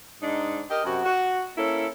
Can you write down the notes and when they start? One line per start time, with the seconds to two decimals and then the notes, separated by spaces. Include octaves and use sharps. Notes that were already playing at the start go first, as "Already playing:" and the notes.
0.21 G#2 D4 D#4
0.70 G4 A#4 D#5
0.85 F#2 C3 F#4
1.04 F#4
1.58 A#3 C#4 E4 A4